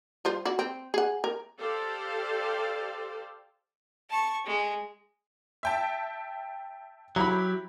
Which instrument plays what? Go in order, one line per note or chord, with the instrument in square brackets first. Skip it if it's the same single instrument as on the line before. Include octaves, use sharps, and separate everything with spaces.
[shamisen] G3 F4 C5
F#4 D5
C4
G#4 F#5
A#4
[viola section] G4 A4 C5 D5 F5
[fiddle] A5 C#6
G#3
[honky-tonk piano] E5 G5 A5
[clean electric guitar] F#3 [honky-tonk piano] E4 G4 [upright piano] A#5 B5